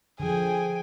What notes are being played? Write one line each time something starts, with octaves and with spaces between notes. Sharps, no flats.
D3 F3 G#4 G5 G#5